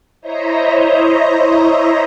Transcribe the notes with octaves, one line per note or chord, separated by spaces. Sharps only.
E4 C5 C#5 D#5 E5 A#5